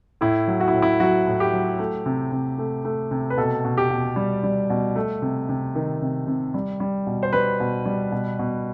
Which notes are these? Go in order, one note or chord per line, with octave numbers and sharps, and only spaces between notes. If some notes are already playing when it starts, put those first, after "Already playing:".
A2 E4
F#3
F#4
E4
A2
E4
F#3 F#4
A2
G4
F#3
A3
C3
C3
A3
A3
C3
B4
B2 A4
B2
G4
B2
G3
G3
B2
A3
C3
C3
D#3
C3
C3
G3
G3
B2
C5
G3 B4
B2
G3
B2
B2